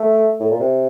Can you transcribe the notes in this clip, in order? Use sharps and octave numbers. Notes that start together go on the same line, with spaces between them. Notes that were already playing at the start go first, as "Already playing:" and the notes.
Already playing: A3
A2
A#2
C3